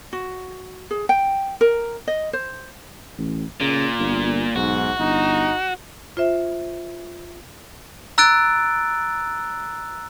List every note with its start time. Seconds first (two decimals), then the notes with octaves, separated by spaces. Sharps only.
0.13 F#4
0.91 G#4
1.09 G5
1.61 A#4
2.07 D#5
2.33 C5
3.18 A1
3.60 A#2 C#3
3.99 G1
4.56 B1 G#2 F#4
4.99 G1 D#4
6.17 F4 C5 E5
8.18 A#5 E6 F#6 A6 D7